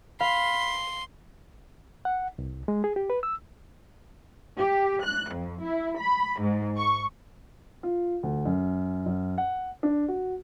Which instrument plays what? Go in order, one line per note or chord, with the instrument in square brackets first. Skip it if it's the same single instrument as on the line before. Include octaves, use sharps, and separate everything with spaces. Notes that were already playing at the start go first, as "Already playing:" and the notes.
[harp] F5 [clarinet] B5 [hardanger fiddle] C6
[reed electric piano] F#5
C2
G#3
G#4
G4
B4
E6
[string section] G4
F#6
F2
E4
B5
G#2
C#6
[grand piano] F4
D2
F#2
F#2
F#5
D4
F#4